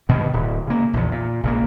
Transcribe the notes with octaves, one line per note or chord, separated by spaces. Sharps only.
G2 B2 D#3
D1
C#3 A#3
A#1 E2
A#2
A#1 C#3 A#3